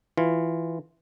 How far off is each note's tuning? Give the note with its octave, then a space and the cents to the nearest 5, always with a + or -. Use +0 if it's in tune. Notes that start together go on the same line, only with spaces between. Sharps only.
E3 +0 F4 +0